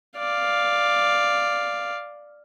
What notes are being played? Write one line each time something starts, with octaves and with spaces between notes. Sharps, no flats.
D5 F5